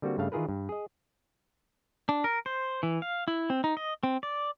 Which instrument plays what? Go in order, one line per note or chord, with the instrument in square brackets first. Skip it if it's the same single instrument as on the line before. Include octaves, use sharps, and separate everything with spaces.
[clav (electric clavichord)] D3 G3 A#3 C4 F#4
G2 C#3 A3 F5
D#3 E3 F4 G#4 A#4 B4
G2
G#4 D#5
[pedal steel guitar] D4
A#4
C5
E3
F5
E4
C4
D#4
D#5
C4
D5